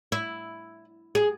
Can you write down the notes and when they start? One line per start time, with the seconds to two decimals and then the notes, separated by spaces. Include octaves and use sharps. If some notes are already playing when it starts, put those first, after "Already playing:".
0.12 E4
1.15 G#4